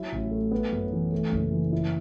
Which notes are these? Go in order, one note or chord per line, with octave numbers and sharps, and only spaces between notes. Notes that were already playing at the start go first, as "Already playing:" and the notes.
Already playing: F#3 E4
A1
A3
B3
F#2
E3
A3
F#1
E3
E4